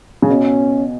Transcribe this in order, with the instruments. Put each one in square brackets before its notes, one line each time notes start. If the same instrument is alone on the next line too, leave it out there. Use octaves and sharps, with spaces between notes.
[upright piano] C#3
[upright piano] B2 [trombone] C#4